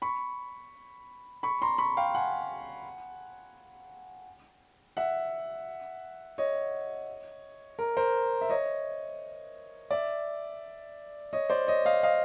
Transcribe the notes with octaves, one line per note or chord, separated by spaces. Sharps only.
B5 C#6
B5 C#6
A#5 C6
B5 C#6
F5 G5
F#5 G#5
E5 F#5
C#5 D#5
A#4
A#4 C5
E5
C#5 D#5
D5 E5
C#5 D#5
C5 D5
C#5 D#5
D#5 F5
D#5 F5